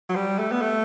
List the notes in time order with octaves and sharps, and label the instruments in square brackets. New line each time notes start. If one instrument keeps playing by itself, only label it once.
[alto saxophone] F#3
G3
A3
B3
A3